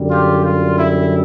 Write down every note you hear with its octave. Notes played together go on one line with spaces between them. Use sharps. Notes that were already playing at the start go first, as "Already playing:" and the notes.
Already playing: F#2 D3 G3
F4 G4
F4
E4